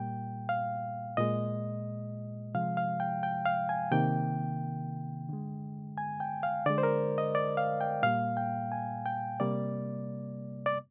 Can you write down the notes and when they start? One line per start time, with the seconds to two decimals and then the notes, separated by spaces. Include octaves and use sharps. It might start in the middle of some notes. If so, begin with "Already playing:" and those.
Already playing: A#2 G3 A#3 G5
0.49 F5
1.17 A#2 G#3 D#5
2.54 C3 F3 G#3 F5
2.77 F5
3.00 G5
3.23 G5
3.45 F5
3.69 G#5
3.91 C3 D#3 A#3 G5
5.29 D3 G#3
5.98 G#5
6.20 G5
6.43 F5
6.66 D3 G#3 D5
6.78 C5
6.83 A#4
7.18 D#5
7.35 D5
7.57 F5
7.81 G5
8.03 A#2 G3 A#3 F5
8.37 G5
8.72 G#5
9.06 G5
9.40 C3 G3 A#3 D5
10.66 D5